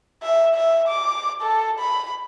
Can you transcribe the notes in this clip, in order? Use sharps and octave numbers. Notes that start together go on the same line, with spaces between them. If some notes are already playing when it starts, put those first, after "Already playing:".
E5
E5
D6
A4
B5